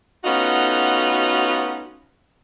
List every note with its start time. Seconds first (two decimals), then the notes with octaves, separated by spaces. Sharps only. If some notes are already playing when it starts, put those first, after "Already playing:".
0.24 A3 B3 C#4 D#4 F4 F#4